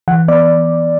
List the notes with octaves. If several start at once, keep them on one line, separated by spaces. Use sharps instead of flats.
E3 F#5
B3 D5